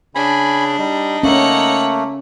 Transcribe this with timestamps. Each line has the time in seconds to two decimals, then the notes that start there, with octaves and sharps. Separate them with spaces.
0.15 C#3 D4 G#5 B5
0.79 G3 D#4
1.23 A3 A#3 C#4 C#5 F#5